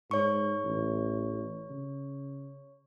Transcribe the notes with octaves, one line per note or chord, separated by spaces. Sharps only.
G#2 C#5 C#6
A1
C#3